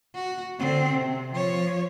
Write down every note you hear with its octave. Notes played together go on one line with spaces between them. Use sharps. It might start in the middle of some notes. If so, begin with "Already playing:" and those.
F#4
D3 C4
C3
F3 C#5